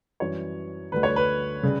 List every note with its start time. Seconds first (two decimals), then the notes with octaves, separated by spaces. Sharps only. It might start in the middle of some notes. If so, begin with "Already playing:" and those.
0.20 F#2 E3 G3 C#5
0.92 D2 D3 G3 B4
1.03 C#5
1.16 B4
1.63 C#3 G3